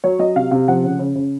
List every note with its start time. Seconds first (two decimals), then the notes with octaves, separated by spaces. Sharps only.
0.04 F#3 C#5
0.19 F#3 D#5
0.36 C3 F5
0.51 C3 F5
0.68 F3 F#5
0.84 C#3
0.99 C#3
1.15 C#3